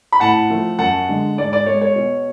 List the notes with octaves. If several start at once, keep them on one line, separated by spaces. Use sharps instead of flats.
B5
A2 F#5 A5
F3 A3
F#2 F#5 A5
D3 G#3
G#2 D5
D5
G#3 C#5
C#5
B2